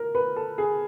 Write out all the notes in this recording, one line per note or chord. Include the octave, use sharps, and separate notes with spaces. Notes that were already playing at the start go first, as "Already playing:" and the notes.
Already playing: A#4
B4
A4
G#4